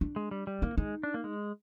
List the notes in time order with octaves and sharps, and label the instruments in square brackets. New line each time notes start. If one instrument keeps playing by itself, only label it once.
[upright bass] D4
[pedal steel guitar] G#3
G3
G3
[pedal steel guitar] A#3 [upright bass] D#4
[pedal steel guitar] G#3 [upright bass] D#4
[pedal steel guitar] D4
A#3
G#3